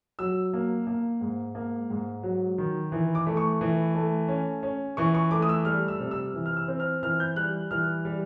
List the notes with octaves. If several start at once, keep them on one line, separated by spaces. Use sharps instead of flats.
F#3 E6
A#3
A#3
G#2
A#3
G#2
F#3
D#3
E3
D6
A3
C#6
E3
A3
C#4
C#4
E3 C#6
C#6
A3 D6
D#6
E6
G3 F6
E6
C3
E6
E3
F6
E6
C4
F6
E3 F6
G6
G3 F#6
E3 F6
G3